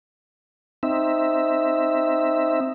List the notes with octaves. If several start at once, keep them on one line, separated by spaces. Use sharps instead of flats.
C4 D#4 E5